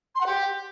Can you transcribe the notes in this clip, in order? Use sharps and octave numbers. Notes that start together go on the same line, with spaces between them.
C6
F#5
G4